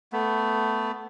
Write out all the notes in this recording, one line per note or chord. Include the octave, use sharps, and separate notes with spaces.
A3 B3